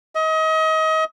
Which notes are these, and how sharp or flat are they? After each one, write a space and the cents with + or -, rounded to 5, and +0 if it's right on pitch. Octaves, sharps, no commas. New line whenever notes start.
D#5 +30